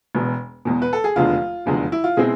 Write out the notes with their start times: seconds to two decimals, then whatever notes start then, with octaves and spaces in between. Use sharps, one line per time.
0.15 E1 E2 B2
0.65 E1 E2 B2
0.82 B4
0.93 A4
1.04 G#4
1.16 F1 E2 D3 F3 G#3 F4
1.66 F1 E2 D3 F3 G#3
1.92 E4
2.04 F4
2.17 B2 G#3 C4 E4 G#4